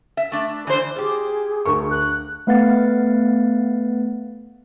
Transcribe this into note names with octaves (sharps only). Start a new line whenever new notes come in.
E5
A3 D4
D3 E3 C5
F4 G4 G#4
D2 A#4 C#6
F#6
A3 B3 B4 F5 F#5 A6